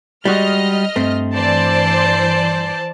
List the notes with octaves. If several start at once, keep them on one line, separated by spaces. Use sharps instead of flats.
G3 G#3 F#4 D#5 F6
G2 A3 C4
E3 C5 D5 A5